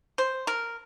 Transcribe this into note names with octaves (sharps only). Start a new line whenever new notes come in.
C5
A#4